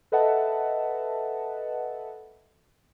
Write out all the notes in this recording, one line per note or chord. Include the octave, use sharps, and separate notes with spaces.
A4 B4 D#5 E5 F#5 A5